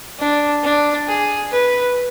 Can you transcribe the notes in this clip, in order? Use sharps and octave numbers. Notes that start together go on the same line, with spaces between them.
D4
D4
G#4
B4